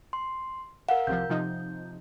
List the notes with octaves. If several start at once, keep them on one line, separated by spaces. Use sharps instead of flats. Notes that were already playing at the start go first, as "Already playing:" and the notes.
C6
A#4 F5 F#5
C2 C3 F3 G6
C3 F3 D#4